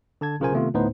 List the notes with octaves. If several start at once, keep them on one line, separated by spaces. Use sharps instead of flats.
D3 A5 G#6
B1 C#3 F4 A#4 C5 G#5
C3 D#3 A3 B3 F4
D2 A2 B3 D#4 B4 C5